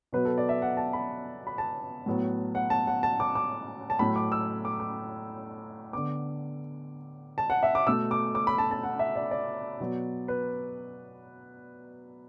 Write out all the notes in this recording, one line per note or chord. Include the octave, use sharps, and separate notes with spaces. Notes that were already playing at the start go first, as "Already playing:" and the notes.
B2 F#3 B3 B4
A4
D5
E5
F#5
A5
B5
B5
A5
A2 F#3 B3
F#5
A5
F#5
A5
D6
D6
A5
A2 F#3 A3 B5
D6
E6
D6
D6
D3 B3 D6
A5
F#5
E5
D6
B2 A3 E6
D6
D6
B5
A5
A5
F#5
E5
D5
D5
B2 F#3 B3
B4